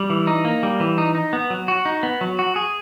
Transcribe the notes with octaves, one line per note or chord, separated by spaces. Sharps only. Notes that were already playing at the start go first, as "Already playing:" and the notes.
Already playing: G3
E3
D#4
A#3
G3
E3
D#4
D#4
B3
F#3
F#4
D#4
B3
F#3
F#4
G#4